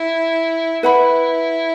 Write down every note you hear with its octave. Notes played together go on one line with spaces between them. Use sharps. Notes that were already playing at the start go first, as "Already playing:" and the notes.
Already playing: E4
E4 B4 F#5 B5